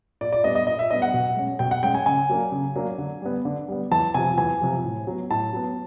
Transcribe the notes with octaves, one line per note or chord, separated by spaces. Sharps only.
A#2 D5
D5
G3 B3 D4 D#5
D#5
A#2 D#5
E5
G3 B3 D4 D#5
F#5
B2
G#3 C#4
B2 G5
F#5
G#3 C#4 G5
G#5
C#3 G#5
F#3 A#3 D4
C#3
F#3 A#3 D4
D3
G3 B3
D3
G3 B3
E2 A5
C3 F3 G#5
E2 G#5
C3 F3
A2
F#3 B3
A2 A5
F#3 B3